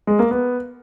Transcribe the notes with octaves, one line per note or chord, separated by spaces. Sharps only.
G#3
A#3
B3